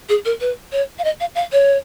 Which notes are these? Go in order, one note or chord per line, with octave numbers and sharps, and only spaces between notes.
G#4
A#4
B4
C#5
F5
D#5
F5
F5
C#5